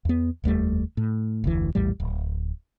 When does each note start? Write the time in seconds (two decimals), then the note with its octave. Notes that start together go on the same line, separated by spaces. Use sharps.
0.05 E2 B3
0.44 F1 D#2 G3 A3
0.97 A2
1.44 F1 D2 E3
1.75 A#1 E2 A2 G3
2.00 D1